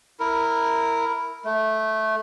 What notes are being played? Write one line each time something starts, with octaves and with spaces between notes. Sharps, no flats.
E4 A#4
A3